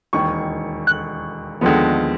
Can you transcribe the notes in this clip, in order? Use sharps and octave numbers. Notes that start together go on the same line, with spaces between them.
E1 D#2 D#3 C#6
F#6
D#2 D3 F3 G#3 B3